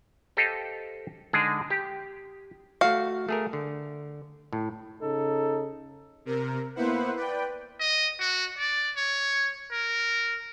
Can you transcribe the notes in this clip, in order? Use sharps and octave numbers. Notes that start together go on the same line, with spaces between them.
G4 A4 C5 D#5 F5
D3 G#3 D4 D#4 G#4
G4
A3 F#4 F5
A3 G#4 A#4
D3
A2
C#3 D#4 A4
C3 A#4
A#3 B3 E4 B4 C5 F#5
B4 D5 G5
D#5
F#4
D5
C#5
A#4